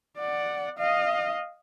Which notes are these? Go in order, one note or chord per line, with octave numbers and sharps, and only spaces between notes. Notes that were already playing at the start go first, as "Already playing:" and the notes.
D5 F#5
D#5 F5